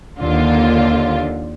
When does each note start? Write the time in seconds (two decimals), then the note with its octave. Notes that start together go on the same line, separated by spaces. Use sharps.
0.18 D#2 D3 F4